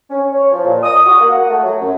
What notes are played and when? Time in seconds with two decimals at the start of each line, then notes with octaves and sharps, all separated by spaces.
0.10 C#4
0.33 C#5
0.51 F3
0.64 A#2
0.83 D#6
1.06 F#4
1.20 A#3
1.32 F#5
1.50 A3
1.63 F#3
1.81 F#2